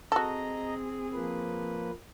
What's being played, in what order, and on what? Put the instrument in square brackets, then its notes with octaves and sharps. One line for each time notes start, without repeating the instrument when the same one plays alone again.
[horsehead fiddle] C4 G#4 [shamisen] F#4 A4 [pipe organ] D#5 A#5
[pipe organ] F3 A#3 B4